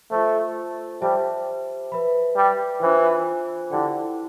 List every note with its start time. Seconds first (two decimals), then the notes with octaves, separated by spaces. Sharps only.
0.11 A3 F4 A4 C5
1.02 G3 G4 C5 E5 A5
1.92 B4 E5 B5
2.36 G3
2.82 E3 D4 F4 C5
3.72 D3 E4 G4 D5 G5